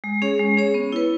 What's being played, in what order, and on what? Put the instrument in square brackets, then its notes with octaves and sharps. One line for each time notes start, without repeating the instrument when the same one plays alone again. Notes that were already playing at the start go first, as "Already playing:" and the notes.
[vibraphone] G#3
C#4 G#4 C#5
G#3
C#4 G#4 C#5
B3
E4 B4